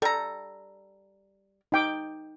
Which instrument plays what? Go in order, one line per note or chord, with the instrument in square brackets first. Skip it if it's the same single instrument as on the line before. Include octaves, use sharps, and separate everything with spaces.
[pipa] G3 A#5 [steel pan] A4
[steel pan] D#4 G5 D6